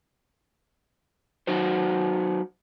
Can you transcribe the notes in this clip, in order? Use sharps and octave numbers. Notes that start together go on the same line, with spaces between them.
F#3 D#4 F#4 C5